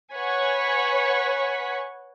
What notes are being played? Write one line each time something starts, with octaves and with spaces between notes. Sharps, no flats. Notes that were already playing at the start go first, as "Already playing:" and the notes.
B4 C#5 F#5 G#5 C#6 B6